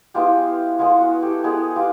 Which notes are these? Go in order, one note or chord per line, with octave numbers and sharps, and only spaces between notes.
G#3 B3 E4 F4 G4
G#3 B3 E4 F4
F#4
G4 A4
G#3 B3 E4 F#4 G#4
F4 G4